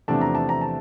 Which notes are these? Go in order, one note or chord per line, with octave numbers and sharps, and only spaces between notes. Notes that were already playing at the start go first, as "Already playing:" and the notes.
E2 C3 F3 A3 D4 A5
A#5
A5
A#5
A5